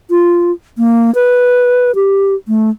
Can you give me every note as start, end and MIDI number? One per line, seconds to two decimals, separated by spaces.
0.10 0.52 65
0.78 1.13 58
1.15 1.94 71
1.95 2.34 67
2.48 2.70 57